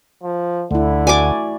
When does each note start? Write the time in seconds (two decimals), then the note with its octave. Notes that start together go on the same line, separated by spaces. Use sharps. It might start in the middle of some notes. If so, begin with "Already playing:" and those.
0.23 F3
0.71 D2 D3 A3 E4
1.07 F#4 D5 G#5 D6